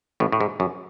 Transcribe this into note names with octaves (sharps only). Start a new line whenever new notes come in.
A1 A2
A2
G#2
F#2